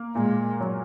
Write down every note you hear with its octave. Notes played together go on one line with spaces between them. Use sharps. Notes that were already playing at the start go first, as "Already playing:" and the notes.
Already playing: A#3
A#2 G#3
F#3